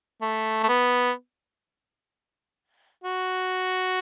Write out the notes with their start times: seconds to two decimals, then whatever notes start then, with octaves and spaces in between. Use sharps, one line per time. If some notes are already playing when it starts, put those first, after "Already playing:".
0.22 A3
0.63 A3
0.69 B3
3.04 F#4